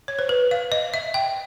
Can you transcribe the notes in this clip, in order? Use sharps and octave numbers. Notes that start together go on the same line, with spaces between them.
C#5
C5
B4
F5
D#5
E5
G5